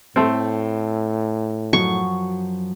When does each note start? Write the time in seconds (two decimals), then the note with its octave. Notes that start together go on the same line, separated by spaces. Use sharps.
0.16 A2 A3 C4
1.73 F#2 F3 F#3 C#6